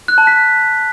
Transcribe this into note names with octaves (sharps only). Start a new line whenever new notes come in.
F#6
A5
B6